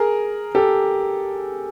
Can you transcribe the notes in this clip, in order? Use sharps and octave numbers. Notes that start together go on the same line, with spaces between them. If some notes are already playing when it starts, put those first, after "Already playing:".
Already playing: G#4 A#4
G4 A4